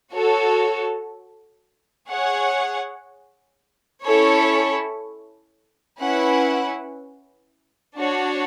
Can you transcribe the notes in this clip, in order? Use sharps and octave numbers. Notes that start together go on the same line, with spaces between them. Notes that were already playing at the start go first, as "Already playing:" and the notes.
F#4 A4 C#5
G#4 C#5 F#5
C#4 E4 A4 C#5
C#4 E4 B4 F#5
D4 F#4 C#5